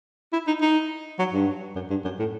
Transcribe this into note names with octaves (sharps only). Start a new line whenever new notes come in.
E4
D#4
D#4
F#3
G2
F#2
G2
F#2
A2